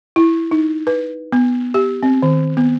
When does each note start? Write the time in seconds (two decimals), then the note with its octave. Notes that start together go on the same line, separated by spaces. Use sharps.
0.16 E4
0.51 D#4
0.87 B4
1.32 B3
1.74 G4
2.03 C4
2.22 D#3
2.57 B3